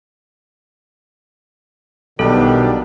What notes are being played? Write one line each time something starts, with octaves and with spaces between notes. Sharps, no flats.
B1 B2 D#3 G3 D4 A4